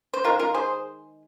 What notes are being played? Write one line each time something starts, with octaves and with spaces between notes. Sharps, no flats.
C5
D#3 G#3 F4 A#4
F4 A#4
G#4 C5